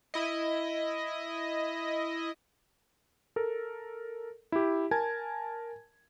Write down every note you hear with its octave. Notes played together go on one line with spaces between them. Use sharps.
E4 D#5
A4 A#4
E4 G4
A#4 G#5 A5 G#6